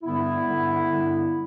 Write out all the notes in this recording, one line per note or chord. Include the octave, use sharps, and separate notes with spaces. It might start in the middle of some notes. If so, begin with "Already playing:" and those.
G2 D3 G3 B3 E4
G2 D3 G3
G2 D3 G3